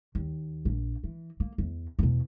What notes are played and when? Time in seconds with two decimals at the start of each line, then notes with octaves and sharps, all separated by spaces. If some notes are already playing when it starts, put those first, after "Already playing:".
0.15 D#2
0.65 A#1
1.04 E3
1.40 A#3
1.58 E2
1.99 E2 B2